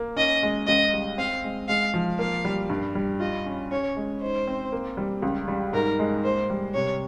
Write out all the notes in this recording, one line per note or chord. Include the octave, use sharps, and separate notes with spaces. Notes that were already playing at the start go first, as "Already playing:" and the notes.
Already playing: A#3
C#4 D#5
G#3
C#2 D#5
G3
C4 F5
G#3
G#3 F5
F3
A#3 F5
G3
G2
G3
F4 D#5
C#4
C#4 C#5
G#3
D#4 C5
C4
A#3
G3
C#2
G3
G#2 A#4
G#3
A#3 C5
G3
C3 C#5